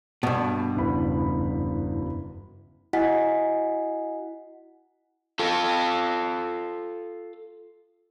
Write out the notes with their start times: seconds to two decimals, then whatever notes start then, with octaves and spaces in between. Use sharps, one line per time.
0.23 G2 B2 A5
0.76 F#1 E2 B5
2.93 E4 F#4 D#5 F#5 G#5 B6
5.39 F4 A4